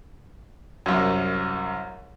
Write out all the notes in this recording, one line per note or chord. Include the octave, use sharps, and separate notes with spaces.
C2 F#2